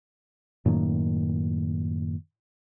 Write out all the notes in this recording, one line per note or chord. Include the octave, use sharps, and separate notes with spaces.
F#2 A2 D#3 A#3